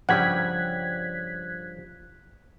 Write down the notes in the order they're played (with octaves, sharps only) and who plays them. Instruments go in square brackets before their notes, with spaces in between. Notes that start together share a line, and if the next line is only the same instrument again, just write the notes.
[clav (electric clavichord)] G2 C#3 G3 [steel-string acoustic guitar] F3 [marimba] F#5 [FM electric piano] F#6 G#6 B6